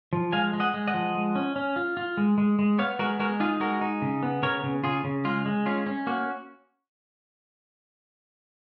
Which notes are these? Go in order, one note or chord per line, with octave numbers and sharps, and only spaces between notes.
F3
G#3 F5 G#5
G#3
D#5 F#5
G#3
D#5 F#5
F3
G#3
C#4
C#4
F4
F4
G#3
G#3
G#3
B3 C#5 F5
G#3 F#4 A#4
G#3 F#4 A#4
D#4 F4 G#4
G#3 F#4 A#4
D#4
C#3
B3
C#3 A#4 C#5
C#3
C#3 F4 G#4
C#3
G#3 F4
G#3
C#4 F4
C#4
A#3 F#4